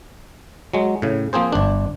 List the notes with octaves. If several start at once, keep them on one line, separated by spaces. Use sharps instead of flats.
F#3 G#3
A2 C#3
F3 A#3 C4 G#4 C5
G1 D4